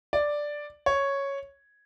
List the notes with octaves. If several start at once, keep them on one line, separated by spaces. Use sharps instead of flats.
D5
C#5